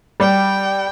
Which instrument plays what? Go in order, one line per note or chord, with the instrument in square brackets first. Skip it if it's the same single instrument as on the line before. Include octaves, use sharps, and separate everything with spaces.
[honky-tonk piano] G3 [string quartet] G5